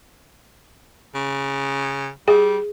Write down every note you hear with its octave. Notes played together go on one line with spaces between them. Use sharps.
C#3
G3 G#4